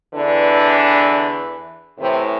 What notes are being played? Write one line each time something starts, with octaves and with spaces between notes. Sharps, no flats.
E2 D3 E3 D4
A2 C3 E3 C4